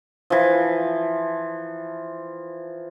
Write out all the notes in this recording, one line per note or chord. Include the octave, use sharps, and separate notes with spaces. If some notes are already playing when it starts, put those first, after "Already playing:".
E3 F3